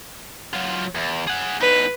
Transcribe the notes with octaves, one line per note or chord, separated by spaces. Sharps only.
F#3 F4
E2
G#4 F#5
E2 D#4 B4